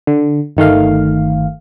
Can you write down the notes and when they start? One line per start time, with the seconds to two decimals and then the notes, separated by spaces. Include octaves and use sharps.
0.07 D3
0.57 G1 D#3 A3 F5